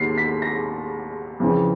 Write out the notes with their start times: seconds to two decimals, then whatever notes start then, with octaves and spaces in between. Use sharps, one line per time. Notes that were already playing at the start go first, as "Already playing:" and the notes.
Already playing: D#2 C7
0.18 B6
0.42 A#6
1.40 F2 C#3 E3